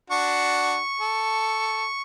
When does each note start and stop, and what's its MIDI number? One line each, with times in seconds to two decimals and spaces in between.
0.10 0.78 62
0.10 0.78 66
0.10 2.02 85
1.00 1.84 69